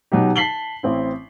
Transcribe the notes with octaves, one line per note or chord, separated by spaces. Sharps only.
B2 F#3 D#4 G4
A5 B6 C7 F#7 G7
A1 C4 E4